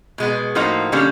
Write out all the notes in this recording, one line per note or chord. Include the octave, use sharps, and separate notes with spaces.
B2 G#3 B3
A2 F3 A#3 D#4 F#4
D3 G3 A#3 C#4